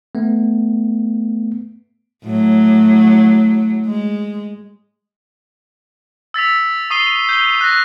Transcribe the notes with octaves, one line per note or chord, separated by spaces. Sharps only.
A3 B3
A2 F#3
G#3
E6 A6 B6 F7
C#6 D#6 C7 D#7 G7
G6 G7
F#6 A#6